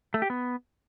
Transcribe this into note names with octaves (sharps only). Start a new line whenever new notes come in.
A3
G4
B3